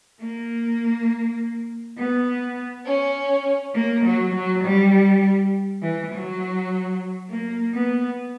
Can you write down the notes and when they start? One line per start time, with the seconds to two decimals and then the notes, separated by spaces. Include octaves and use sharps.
0.20 A#3
1.97 B3
2.86 C#4
3.75 A#3
4.05 F#3
4.34 F#3
4.63 G3
5.82 E3
6.12 F#3
7.30 A#3
7.74 B3